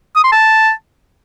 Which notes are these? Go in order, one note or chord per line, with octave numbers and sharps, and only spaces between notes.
D#6
C6
A5